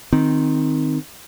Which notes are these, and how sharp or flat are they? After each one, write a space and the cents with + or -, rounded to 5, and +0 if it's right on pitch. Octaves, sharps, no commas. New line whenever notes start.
D#3 +0 C4 +0